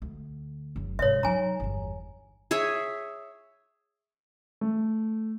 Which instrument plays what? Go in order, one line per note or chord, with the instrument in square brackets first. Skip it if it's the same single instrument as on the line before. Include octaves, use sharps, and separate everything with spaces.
[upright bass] D2
F#1 F#3
[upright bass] G#2 C3 [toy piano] C#5 E5
[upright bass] F#3 D#4 [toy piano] G#5 A#5
[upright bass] G1 E2
[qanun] G#4 C#5 E5
[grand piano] A3